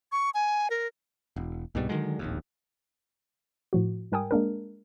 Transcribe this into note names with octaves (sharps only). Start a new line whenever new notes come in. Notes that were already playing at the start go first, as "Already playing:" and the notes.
C#6
G#5
A#4
E1
C2 G#2 B2 G3
D3 D#3 F#3 G#3
D1 A#1 D#2
A2 F3 F#4
G#2 G3 A#4 G5 G#5 D#6
G#3 A#3 D4 A#4